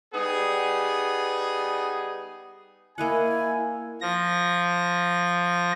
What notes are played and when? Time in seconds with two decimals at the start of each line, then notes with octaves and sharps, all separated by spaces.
0.14 G3 B3 D#4 G#4
2.98 A#3 E4 D#5 F#5 G#5
4.01 F3 A#6